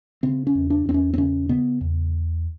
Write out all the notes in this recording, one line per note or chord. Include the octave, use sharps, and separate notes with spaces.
C#3 C4
C#4
E2
D4
E2 C4
C#4
C4
C#3 C#4
C#3 B3
E2